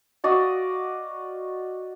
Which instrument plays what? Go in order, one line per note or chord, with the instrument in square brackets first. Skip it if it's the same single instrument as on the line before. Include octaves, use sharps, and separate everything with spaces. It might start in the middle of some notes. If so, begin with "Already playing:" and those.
[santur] F#4 D5 D#5 F5